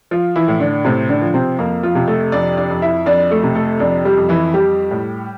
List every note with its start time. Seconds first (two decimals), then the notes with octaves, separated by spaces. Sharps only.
0.11 F3 F4
0.36 E3 E4
0.48 A2
0.60 D3 D4
0.84 A2 C3 C4
1.09 D3 D4
1.22 F3
1.34 C3 C4
1.58 F2 A#3
1.83 F3 F4
1.95 C3
2.07 A3 A4
2.32 F2 D4 D5
2.57 D4 D5
2.70 F2
2.82 E4 E5
3.06 F2 D4 D5
3.31 A3 A4
3.43 C3
3.55 A3 A4
3.80 F2 D4 D5
4.05 G3 G4
4.17 F2
4.29 E3 E4
4.54 G3 G4
4.91 A2